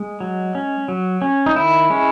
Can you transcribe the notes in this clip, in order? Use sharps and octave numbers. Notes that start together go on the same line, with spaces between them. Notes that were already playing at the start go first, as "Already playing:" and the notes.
Already playing: G#3
F#3
C#4
F#3
C#4
D#4
D#3 E4
G#3 C#4